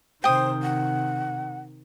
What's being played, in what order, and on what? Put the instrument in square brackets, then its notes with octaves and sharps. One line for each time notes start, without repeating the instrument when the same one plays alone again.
[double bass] C3 D#3 [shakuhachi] C5 [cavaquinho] G5 D#6
[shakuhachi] F#5